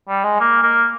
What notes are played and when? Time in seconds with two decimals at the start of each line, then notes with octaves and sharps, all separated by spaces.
0.09 G3
0.24 G#3
0.40 A#3
0.63 A#3